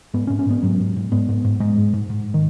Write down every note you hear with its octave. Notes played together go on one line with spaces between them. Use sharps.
G#2 B3
C#4
G#2
C#4
G#2 B3
G#2 F#3
G#2
G#2
G#2 B3
G#2
G#2
G#2 G#3
G#2
G#2
G#2
D#3